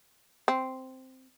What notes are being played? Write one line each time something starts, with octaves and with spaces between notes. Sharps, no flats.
C4